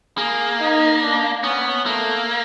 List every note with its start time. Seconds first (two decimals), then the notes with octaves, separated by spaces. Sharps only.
0.17 A#3 G#4
0.60 D#4
1.02 D4
1.43 B3 C#4
1.86 A3 A#3